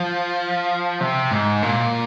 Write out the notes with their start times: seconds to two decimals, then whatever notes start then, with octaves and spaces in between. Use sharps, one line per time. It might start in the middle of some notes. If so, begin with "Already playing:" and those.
Already playing: F3
1.01 C3
1.31 G#2
1.63 A#2